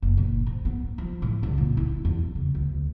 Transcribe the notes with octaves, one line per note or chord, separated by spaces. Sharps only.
F#1
A#2
G#2
B3
F3
A2
C#2
A#2
E4
E2
C#3
D2